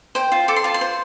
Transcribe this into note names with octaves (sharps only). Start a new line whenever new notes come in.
C5 G5
F4
A4 D6
C6
F4 A5
C6
C5